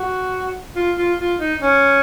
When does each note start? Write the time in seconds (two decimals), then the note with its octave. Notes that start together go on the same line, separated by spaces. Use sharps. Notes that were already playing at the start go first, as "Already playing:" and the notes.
Already playing: F#4
0.76 F4
0.97 F4
1.19 F4
1.40 D#4
1.60 C#4